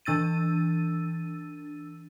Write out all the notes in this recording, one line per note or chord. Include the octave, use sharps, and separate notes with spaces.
E3 D4 E6 A6 D#7